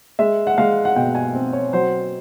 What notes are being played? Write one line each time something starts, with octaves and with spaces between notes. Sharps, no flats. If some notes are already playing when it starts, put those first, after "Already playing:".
G#3 E5
F#5
G#3 F5
F#5
B2 G5
G#5
C4
C#5
F#3 C5